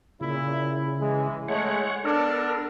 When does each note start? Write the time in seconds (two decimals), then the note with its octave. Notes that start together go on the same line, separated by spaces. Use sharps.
0.21 A#2 C#3 E4
1.00 E3 G#3
1.48 G#3 A3 C#5 F#5
2.05 B3 D4 A4 A#4